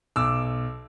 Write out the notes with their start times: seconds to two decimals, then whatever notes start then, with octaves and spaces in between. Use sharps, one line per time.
0.16 B1 D6 E6